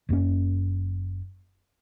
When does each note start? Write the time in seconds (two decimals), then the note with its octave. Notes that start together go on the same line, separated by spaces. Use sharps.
0.09 F#1 F#2 A#3 C#4